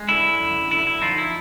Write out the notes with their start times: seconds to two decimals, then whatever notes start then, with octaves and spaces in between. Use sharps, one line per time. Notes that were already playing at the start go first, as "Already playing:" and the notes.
Already playing: G#3
0.09 D3 E4
0.39 F#2
0.71 D3 E4
0.87 E4
1.01 F3 D#4 F4
1.18 E4